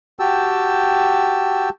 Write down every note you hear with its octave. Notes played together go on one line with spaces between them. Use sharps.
F#4 G4 G5 A5 E6